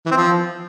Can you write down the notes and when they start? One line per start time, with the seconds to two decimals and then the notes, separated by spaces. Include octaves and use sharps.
0.06 E3
0.11 C4
0.17 F3